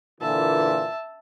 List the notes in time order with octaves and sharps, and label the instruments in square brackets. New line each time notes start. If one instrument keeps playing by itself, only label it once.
[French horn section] A#2 D3 E3 [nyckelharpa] E5 A5